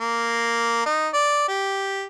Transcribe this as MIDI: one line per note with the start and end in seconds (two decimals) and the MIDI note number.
0.01 0.85 58
0.86 1.08 63
1.13 1.45 74
1.48 2.05 67